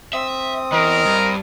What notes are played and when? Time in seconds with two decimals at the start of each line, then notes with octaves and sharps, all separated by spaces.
0.13 C4 E5 D#6
0.72 E2 E3 A#4 D#5
1.05 G2